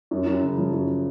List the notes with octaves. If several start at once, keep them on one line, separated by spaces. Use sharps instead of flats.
F#2
F#2
C#3
F3
F#2